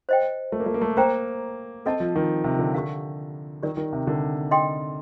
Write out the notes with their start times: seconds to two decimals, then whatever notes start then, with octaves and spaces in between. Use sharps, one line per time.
0.09 C5 D#5 G5
0.52 A3
0.60 A#3
0.66 A3
0.74 A#3
0.82 A3
0.97 A#3 C5 G5 A#5
1.86 C4 A4 D#5 A5
2.00 F3
2.16 D#3
2.44 C3
2.59 D3
2.74 G4 A#4 F5
3.63 D#3 G4 A#4 D5
3.77 D#3
3.93 C3
4.07 D3
4.51 A4 D#5 G5 C6